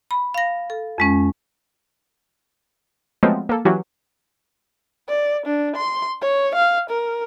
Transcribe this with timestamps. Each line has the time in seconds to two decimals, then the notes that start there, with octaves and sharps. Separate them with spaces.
0.11 B5
0.34 F5 A#6
0.70 A4
0.98 F2 G#3 C#4
3.23 F3 F#3 G#3 A3 B3 C4
3.49 A#3 A4
3.65 E3 F#3 C#4 F#4 G4
5.09 D5
5.46 D4
5.76 C6
6.22 C#5
6.55 F5
6.90 A#4